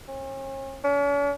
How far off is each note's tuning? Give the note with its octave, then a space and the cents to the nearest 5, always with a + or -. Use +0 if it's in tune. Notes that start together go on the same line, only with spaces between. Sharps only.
C#4 -40
C#4 +45